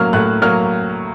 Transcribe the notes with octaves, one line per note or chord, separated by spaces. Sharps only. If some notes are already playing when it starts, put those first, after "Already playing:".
Already playing: A2 F#3 A#3 F6
A2 F#6
F#3 A#3 F6